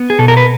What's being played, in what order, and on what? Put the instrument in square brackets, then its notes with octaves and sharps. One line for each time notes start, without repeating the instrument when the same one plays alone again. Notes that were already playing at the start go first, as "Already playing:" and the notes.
Already playing: [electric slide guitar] B3
G#4
B2 A4
A#4
B4